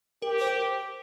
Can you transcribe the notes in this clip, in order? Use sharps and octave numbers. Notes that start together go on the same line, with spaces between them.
G4 A#4
C5
A#4